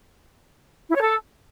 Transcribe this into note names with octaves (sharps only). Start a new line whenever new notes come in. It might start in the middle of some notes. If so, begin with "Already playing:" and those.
E4
C#5
A4